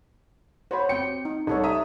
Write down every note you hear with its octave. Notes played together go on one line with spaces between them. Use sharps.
F#4 C5 C#5 B5
C4 G5 C#7
D#4
C2 D#4 A4 C#5
E5 A#5 D#6